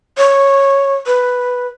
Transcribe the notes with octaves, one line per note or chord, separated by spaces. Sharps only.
C#5
B4